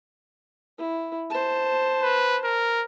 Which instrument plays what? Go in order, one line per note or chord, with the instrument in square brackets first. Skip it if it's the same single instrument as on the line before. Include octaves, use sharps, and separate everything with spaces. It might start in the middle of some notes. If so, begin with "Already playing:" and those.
[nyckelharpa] E4
C5 A5
[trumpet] B4
A#4